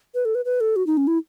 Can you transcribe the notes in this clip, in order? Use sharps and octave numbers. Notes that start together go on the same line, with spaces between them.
B4
A4
B4
B4
A4
F#4
D#4
C#4
E4